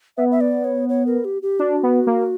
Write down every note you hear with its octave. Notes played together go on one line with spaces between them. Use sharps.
B3 E5
E5
D5
C#5
C#5
A#4
G4
G4
D4 F#4
B3
A#3